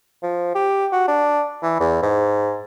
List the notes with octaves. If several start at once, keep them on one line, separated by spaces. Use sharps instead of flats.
F3
G4
F#4
D4
E3
E2
G#2